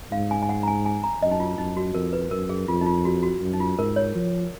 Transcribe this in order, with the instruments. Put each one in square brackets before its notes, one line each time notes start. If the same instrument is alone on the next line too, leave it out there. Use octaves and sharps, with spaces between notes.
[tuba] G#2 [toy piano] F5
[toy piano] G#5
G#5
F#5
A#5
G#5
G#5
A#5
[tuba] F#2 [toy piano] D#5
[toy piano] D#4
F4
[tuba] F#2 [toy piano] D#4
[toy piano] F#4
[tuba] F2 [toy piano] A#4
[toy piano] B4
[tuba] F#2 [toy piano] A#4
[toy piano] G#4
[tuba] F2 [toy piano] F4
[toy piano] D#4
F4
F#4
F#4
[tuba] F#2
[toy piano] D#4
F4
[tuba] G#2 [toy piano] A#4
[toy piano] C#5
[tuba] F3